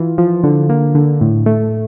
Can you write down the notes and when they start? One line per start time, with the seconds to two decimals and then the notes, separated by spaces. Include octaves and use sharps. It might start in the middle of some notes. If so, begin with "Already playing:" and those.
Already playing: E3 F4
0.18 F3
0.44 D3
0.69 A#3
0.95 D3
1.21 A2
1.46 A3